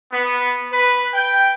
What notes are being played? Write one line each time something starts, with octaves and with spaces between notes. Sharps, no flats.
B3
B4
G5